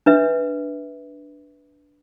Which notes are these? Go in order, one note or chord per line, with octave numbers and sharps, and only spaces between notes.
D4 B4 E5